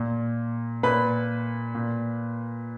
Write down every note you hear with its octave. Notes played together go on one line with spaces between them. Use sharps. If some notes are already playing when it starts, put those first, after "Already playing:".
Already playing: A#2
A#2 B4 B5
A#2